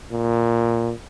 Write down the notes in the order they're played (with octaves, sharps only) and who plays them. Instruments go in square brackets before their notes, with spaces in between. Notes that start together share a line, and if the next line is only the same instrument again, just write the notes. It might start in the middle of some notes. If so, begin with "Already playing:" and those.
[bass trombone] A#2